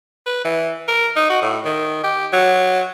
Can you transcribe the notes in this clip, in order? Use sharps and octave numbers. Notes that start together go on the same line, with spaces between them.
B4
E3
A#4
D#4
F#4
A2
D#3
G4
F#3